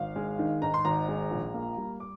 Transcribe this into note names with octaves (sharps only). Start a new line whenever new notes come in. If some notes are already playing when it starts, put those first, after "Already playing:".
Already playing: G#1 F5
G#3
D#3
G#2 A#5
C6
G#1 A#5
G#3
A#1
A#3
G3
D6